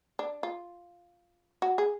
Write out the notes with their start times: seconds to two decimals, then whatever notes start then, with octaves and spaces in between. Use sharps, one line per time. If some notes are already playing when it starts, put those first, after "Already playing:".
0.19 D4
0.43 F4
1.62 F#4
1.78 G#4